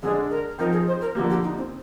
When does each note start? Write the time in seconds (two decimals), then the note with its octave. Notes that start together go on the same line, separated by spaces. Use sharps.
0.03 D3 G#3 D4 G#4
0.31 A#4
0.58 F3 C4 D#4 A#4
0.73 G#4
0.87 C5
1.01 A#4
1.15 D3 F3 A#3 G4
1.30 G4
1.44 D#4
1.58 C4